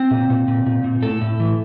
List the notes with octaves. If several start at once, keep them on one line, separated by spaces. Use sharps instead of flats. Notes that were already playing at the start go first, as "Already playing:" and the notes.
Already playing: C4
A#2
A#2
A#2
A#2
A#2
A2 A4
A2
E3